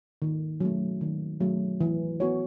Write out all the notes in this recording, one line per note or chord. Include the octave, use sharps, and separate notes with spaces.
D#3
F#3 A3
D#3
F#3 A3
E3
B3 F#4 C#5